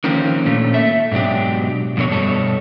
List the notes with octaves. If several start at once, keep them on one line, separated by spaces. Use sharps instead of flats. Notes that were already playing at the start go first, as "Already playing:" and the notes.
D3 D#3 F3 A#3 C4 C#4
A#2 A3 C#4
A3 E5
G#2 B2 F#3 D4 G4
F2 B2 D3 C#5
G2 B2 A4 C#5